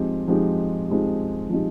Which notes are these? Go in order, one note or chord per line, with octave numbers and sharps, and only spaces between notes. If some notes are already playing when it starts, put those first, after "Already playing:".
Already playing: F3 G#3 C4 D#4 G4
F3 G#3 C4 D#4 G4
F3 G#3 C4 D#4 G4
F3 G#3 C4 D#4 G4